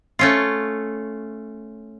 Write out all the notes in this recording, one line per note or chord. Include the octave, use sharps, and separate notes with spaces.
A3 C#4 F4